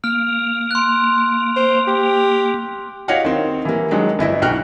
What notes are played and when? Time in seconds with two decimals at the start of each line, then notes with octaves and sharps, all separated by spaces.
0.04 A#3 F6
0.71 C6 F#6
1.56 C5
1.87 G4
3.08 F#4 G4 C#5 D#5 F5 F#5
3.25 D#3 C4
3.65 E3 G3 A#3
3.91 D#3 F#3 G#3 D4
4.19 G1 E4 D#5 E5
4.42 B1 F#4 G5 F6 F#6